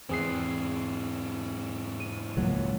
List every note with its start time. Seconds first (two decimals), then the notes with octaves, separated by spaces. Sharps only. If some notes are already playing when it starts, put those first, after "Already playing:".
0.09 E2 G#2 E3 C4 G#4 C7
2.00 D#7
2.37 C#2 A#2 F#3